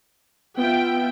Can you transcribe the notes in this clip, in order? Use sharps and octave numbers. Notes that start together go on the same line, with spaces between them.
B3 F4 E5 G5